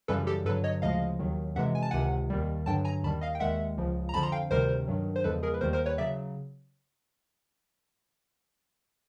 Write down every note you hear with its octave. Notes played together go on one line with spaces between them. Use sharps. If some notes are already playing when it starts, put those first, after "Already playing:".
F#2 C#3 E3 G3 A4 B4
G4 A4
G2 D3 F#3 A4 B4
C#5 D#5
D2 C#3 F3 G#3 D#5 F5
D#2 D#3 F#3
F2 C3 E3 G#3 E5 F#5
G#5
A5
C#2 C3 D#3 F#5 G#5
D#2 D#3 G3
G2 D3 F#3 G5 A5
G#5 A#5
D#2 D#3 G3 A5 B5
D#5 F5
G5
D#2 D#3 G#3 E5 F#5
C#2 C#3 F3
A#5
F2 D3 F3 A5 B5
A#5 C6
F5 G5
D2 C3 D#3 G3 A#4 C5
G2 D#3 F#3
C5
E2 C#3 F3 G#3 A4 B4
G#4 A#4
B4
D#2 D#3 G3 A#4 C5
A#4 C5
B4 C#5
C#3 F#3 D5 E5